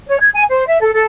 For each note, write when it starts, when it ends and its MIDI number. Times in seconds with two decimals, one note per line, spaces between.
0.07 0.17 73
0.19 0.29 92
0.34 0.43 80
0.50 0.67 72
0.68 0.80 76
0.81 0.91 69
0.93 1.05 69